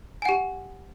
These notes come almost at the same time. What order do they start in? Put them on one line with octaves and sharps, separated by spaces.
G#5 F#5 G4